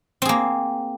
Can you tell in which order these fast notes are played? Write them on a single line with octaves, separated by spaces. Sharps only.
C4 G#4 A#3